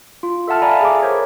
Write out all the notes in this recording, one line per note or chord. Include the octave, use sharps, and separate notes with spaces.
F4
A4 E5 F#5 A5 F6
D5 E5 F5 G#5 A#5 B5
G#4 D6
A#4 C5 C#5